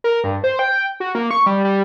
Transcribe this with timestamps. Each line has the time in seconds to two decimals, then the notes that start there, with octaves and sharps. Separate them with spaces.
0.04 A#4
0.24 G2
0.44 C5
0.59 G5
1.00 F#4
1.15 A#3
1.31 C#6
1.46 G3
1.65 G3